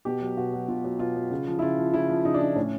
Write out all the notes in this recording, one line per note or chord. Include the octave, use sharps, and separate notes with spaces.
B2 G4
F#3
B2 F#4
F#3
B2 F4
F#3
B2 F4
F#3
C#3
F3
E4
C#3 F4
F3
C#3 E4
F3
C#3 D#4
D4
F3 D#4
A2 C#4